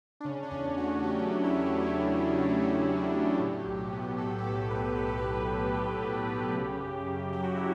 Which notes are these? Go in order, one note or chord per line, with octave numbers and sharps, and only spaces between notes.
D4
C#3 C#4
D4
E2 C#4
A3 F#4
F#3 G4
C#3
E4
E2
A3 F#4
F#3
C#3 E4
F#4
E2 G4
A3
F#3
A2
B1
B3
F#3 A4
G4
A2 A4
B1 B4
B3 B4
A4
F#3 B4
A2
B1 G4
B3
F#3
C#3
F#2
F#2
F#3 G4
F#4
C#3 E4